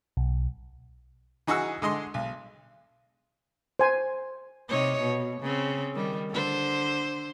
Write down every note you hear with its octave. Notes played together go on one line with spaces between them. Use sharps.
B1
E3 D#4 F#4 G#4 F#5 E6
D3 G#3 D#5 C6
B1
C5 G#5
C3 D#4 C#5
B2
C#3 C4
D#3 G3
D3 C5